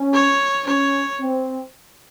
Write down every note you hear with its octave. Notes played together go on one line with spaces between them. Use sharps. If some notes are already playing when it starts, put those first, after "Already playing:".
Already playing: C#4
C#5
C#4 C#5
C4